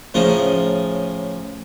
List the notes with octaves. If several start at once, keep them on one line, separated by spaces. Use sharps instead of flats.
A2 C#3 F3 C#4 D#4 G#4